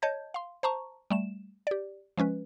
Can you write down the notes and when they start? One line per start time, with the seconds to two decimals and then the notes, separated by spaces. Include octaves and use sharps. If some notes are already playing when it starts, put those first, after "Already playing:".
0.02 C#5 D#5 A5 G6 G#6
0.34 F5 C6
0.63 C5 A5 A#5 C#6
1.10 G3 A3 E7
1.67 G4 D5
2.18 F3 G#3 C#4 B4